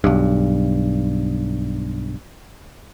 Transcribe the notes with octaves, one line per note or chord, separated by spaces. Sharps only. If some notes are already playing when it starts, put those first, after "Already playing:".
B1 G2